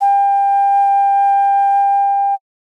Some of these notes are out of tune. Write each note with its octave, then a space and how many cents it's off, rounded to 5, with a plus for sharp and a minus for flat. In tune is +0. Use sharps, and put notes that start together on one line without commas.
G5 +25